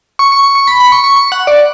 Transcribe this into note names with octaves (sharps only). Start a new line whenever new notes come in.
C#6
C#6
C#6
C#6
B5
B5
C#6
C#6
C#6
F#5
D5